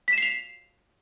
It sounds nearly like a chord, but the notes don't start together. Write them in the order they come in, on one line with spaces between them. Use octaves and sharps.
B6 E7 C7 F7